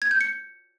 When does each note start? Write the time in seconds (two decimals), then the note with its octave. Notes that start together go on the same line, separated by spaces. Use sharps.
0.02 G#6
0.11 G6
0.21 C#7